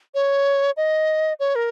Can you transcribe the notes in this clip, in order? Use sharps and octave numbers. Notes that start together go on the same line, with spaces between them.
C#5
D#5
C#5
A#4